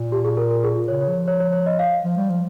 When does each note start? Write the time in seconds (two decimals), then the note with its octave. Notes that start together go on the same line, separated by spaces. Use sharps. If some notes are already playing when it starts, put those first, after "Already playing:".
Already playing: A#2
0.12 G4
0.25 G#4
0.37 A#4
0.51 A#4
0.64 G#4
0.76 F4
0.88 C#3 C#5
1.01 C#5
1.08 F3
1.28 C#5
1.40 C#5
1.53 C#5
1.66 D#5
1.79 F5
2.04 F3
2.17 G3
2.30 F3